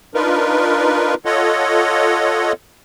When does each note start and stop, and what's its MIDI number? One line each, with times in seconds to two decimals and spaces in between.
0.15 1.14 62
0.15 1.14 63
0.15 1.14 65
0.15 1.14 70
0.15 1.14 71
1.25 2.52 65
1.25 2.52 69
1.25 2.52 73
1.25 2.52 75
1.25 2.52 78